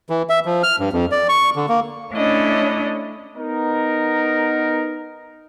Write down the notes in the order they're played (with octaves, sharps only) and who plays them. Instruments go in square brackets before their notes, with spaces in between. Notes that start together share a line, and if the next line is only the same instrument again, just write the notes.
[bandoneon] E3
E5
F3
F6
G2
F2
D5
C#6
D3
A#3
[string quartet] A3 C#4 D4 E4 C#5 D#5
[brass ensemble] B3 D#4 A#4